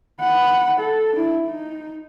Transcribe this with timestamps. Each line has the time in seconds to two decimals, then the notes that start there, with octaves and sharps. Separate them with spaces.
0.21 F#5 B5
0.80 A4
1.16 D4 E4
1.47 D#4